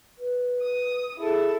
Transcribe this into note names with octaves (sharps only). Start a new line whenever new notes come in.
B4
D#6
E4 G#4 A4